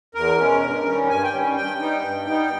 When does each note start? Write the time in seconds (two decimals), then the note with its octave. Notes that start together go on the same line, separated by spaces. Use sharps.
0.15 E2 A#4
0.38 B2 G#3 C#4
0.62 G2
0.86 D#3 G3 C#4
1.09 G2 G#5
1.24 G5
1.32 D#3 G3 C#4
1.56 G2 G5
1.79 G3 B3 D#4
2.03 G2
2.26 G3 B3 D#4